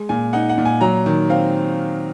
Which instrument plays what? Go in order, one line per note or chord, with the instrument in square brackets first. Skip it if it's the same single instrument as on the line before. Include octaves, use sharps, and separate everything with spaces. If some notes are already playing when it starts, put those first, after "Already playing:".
Already playing: [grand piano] G#3
A#2 G#5
D#4 F#5
F#5
A#2
G#5
F#3 A#5
D#3
C4 F5